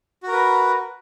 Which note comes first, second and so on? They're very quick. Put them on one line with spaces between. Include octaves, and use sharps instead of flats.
F#4 A#4 B4